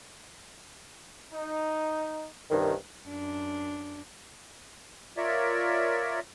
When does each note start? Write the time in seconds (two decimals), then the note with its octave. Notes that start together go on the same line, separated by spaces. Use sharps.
1.33 D#4
2.50 C2 G2 D#3
3.06 F#2 D4
5.17 F4 A#4 C#5 D5 E5